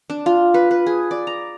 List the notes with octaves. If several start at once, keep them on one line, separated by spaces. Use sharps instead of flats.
D4
F4
B4
B4
G#4
D5
A#5